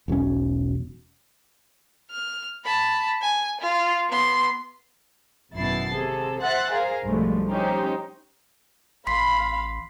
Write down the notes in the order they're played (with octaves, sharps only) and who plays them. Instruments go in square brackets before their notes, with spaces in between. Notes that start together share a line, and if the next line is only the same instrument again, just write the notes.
[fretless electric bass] E1 B1 F#3 C#4
[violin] F6
A5 B5
G#5
F4
B3 C6
[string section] G#1 F#2 B2 E4 A6 C7
C3 G#4 A4
C5 E5 F#5 F#6 A6
G#4 A#4 C5 F5
B1 G2 F3 G#3 A3
C#4 D#4 G4 C5
[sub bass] A1 [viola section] F5 B5 [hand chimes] C6 B6 C7